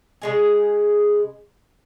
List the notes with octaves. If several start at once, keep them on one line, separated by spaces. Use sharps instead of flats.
C#3 G#3 G#4